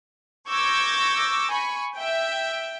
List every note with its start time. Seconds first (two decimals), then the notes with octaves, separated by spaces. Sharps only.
0.49 C#6 D6 E6 G6 G#6 A#6
1.51 G#5 B5 C#6
1.95 E5 G5